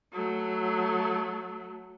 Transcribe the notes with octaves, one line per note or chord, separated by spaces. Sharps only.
F#3 A3